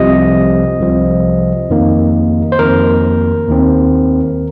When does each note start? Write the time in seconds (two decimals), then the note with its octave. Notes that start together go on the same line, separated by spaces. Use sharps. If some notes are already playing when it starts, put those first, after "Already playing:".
Already playing: C2 C3 F3 D#5
0.80 C2 C3 F3
1.70 F2 D#3 A#3
2.52 C5
2.59 F2 D#3 A#3 A#4
3.48 D#2 D#3 C4